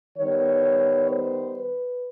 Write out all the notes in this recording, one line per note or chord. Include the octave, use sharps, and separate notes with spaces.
D#3 G3 B3 C#5
C5
B4